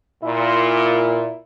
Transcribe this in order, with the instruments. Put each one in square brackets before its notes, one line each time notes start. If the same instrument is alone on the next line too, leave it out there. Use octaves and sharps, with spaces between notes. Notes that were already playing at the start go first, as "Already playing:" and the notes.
[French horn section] A#2 [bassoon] E4